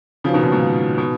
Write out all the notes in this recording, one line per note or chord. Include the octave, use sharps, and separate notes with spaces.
C#3 F3 D#4 F#4 B4
B2 D#3
A#2 C#3
G#2 B2
B2